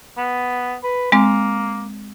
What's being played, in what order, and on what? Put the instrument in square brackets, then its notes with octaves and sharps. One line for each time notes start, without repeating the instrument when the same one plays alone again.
[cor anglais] B3
B4
[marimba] G#3 C4 [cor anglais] A#3